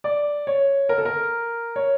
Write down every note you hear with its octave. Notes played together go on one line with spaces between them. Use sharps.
D5
C#5
A#4
A4
A#4
C#5